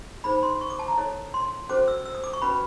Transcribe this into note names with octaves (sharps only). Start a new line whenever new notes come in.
D#4 G#4 C5 B5
C6
C#6
D6
A5
A#5
E4 A4 C#5
C6
C#4 F#4 A4 C5 D6
E6
E6
D#6
D6
C#6
C#4 F#4 B4 B5